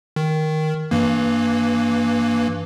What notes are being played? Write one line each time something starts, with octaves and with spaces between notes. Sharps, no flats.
D#3
G2 E3 A#3